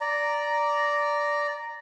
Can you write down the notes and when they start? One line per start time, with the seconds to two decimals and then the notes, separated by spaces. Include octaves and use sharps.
0.01 D5 A#5